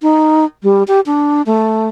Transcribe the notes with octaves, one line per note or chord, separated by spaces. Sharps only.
D#4
G3
G4
D4
A3